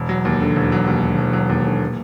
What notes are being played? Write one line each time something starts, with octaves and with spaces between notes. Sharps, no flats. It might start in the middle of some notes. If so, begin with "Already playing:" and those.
Already playing: E1
F#3
D#2
D3
E1
F#3
D#2
D3
E1
F#3
D#2
D3
A#2